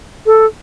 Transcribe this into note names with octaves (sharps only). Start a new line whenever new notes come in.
A4